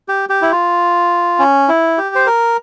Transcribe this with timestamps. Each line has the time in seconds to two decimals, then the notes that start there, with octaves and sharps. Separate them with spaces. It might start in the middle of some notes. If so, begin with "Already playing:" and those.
0.09 G4
0.29 G4
0.42 E4
0.52 F4
1.39 C#4
1.68 E4
1.98 G4
2.15 C5
2.26 A#4